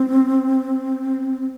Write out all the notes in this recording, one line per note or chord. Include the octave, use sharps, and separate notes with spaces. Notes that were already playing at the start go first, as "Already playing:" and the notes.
Already playing: C4
C4